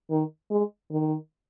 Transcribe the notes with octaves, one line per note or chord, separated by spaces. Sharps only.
D#3
G#3
D#3